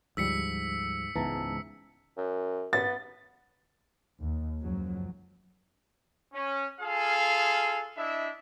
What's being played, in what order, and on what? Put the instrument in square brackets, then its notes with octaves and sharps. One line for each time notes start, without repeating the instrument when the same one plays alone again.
[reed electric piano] D2 F3 G3 [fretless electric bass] G#2 [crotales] E6 B6 C#7
[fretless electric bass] C#2 G#2 E3 [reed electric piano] B3 A5 A#5
[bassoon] F#2
[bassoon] B3 [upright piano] A6
[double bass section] D#2
C#2 F#2 F3 F#3
[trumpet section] C#4
F4 G#4 A4 F5 G#5
D4 E4 D#5 E5